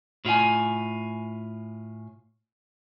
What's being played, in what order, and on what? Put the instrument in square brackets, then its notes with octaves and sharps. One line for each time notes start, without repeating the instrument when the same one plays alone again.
[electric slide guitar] A2 F4 F5 G#5